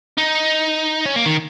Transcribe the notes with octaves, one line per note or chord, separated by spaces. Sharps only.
D#4
C#4
A#3
D#3